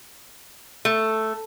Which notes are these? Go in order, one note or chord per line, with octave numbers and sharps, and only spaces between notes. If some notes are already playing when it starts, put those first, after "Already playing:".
A3